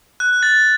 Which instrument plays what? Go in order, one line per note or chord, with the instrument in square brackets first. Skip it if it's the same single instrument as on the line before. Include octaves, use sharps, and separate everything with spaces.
[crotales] F#6
A6